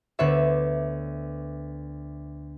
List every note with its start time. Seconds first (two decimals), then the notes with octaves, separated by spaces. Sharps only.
0.19 D2 D3 B3 B4 C#5 E5